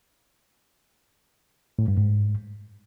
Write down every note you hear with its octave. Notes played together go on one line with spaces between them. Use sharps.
A2
G2
G#2